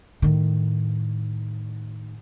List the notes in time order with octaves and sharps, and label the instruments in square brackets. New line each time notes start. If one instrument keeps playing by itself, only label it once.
[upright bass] A2 D#3